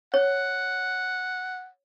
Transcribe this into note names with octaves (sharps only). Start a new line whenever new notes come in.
C#5 F#5